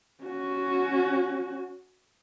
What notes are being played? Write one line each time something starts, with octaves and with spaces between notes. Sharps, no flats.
C#4 F#4